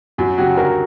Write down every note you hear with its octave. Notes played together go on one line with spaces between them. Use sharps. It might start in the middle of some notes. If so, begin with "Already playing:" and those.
F#2 F#4
C#3 F#3 C#4 F#4 G4
D2 F#4 A#4